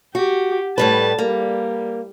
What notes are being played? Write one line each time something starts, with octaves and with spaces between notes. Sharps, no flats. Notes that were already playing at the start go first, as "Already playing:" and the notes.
F#4 G4
A2 G3 B4 A5
G3 A#3